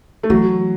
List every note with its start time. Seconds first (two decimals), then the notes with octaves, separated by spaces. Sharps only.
0.23 A3
0.30 E3 F#3